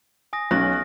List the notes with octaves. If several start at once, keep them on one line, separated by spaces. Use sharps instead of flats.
G#5 D#6 A#6
B1 C#4 F6 F#6 A#6